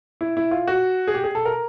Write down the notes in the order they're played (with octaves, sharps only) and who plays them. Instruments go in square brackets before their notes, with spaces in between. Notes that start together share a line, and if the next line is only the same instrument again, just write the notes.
[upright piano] E4
E4
F4
F#4
G#4
G4
G#4
A4
A#4